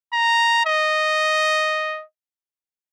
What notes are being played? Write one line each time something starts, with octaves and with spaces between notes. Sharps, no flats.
A#5
D#5